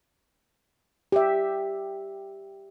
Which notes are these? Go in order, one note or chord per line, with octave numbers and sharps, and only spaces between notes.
G4 E5